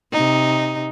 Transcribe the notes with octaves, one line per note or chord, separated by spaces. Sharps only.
C3 D#4